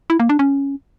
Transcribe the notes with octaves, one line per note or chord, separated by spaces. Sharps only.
E4
A#3
D4
C#4